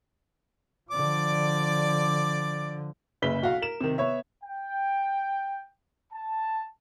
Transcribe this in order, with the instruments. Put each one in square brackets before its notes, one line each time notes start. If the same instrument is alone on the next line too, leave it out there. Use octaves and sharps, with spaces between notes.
[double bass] D3 F3 [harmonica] D5 D6
[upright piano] F#1 C#3 B4 E5 B6 G7
B1 F#4 F5
A#4 E7
C3 D#3
B3 C#5 E5
[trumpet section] G5
A5